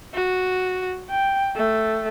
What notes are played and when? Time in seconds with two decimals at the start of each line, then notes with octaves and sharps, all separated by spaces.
0.14 F#4
1.10 G5
1.56 A3